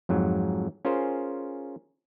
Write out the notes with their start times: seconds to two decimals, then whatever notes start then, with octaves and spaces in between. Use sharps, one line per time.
0.09 F2 G#2 F#3
0.85 C#4 F4 G#4 A#4 C5